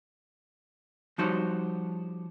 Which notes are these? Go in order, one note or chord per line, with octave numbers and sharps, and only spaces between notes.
F3 G3 D#4 F#4 C5 C#5